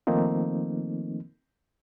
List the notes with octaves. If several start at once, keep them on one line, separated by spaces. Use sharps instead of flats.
D#3 F3 A3 A#3 C4 D#4